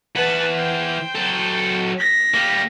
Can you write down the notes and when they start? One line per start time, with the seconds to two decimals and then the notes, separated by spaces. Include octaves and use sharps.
0.16 E3 B4 F#5 A5
0.55 C5 G5
1.15 F#3 A4
1.99 A#6 B6
2.34 G3 A#3